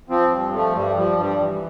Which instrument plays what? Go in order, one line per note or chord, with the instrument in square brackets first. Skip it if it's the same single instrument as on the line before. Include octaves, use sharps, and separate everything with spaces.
[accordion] F3 C4
G2
F3 A3
G2 G3
F3 G3
G2 G3
E3